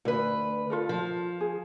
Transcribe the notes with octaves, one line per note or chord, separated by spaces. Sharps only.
D2 B4
F4 A4 A#4
F3
G#4